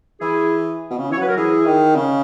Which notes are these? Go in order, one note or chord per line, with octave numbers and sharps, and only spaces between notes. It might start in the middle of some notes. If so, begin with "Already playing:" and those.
E3 E4 G#4
B2
C#3
E3 C#5
F#3 B4
A#4
E3 E4 G#4
D#3
C#3